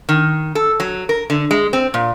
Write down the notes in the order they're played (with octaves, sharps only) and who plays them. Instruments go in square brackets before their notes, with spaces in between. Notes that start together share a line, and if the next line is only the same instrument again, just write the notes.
[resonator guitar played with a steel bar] D#3
A4
F#3
A#4
D3
G#3
C4
A#2